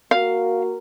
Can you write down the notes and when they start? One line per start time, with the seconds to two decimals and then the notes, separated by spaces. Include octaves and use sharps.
0.11 A#3 F#4 A#4 F5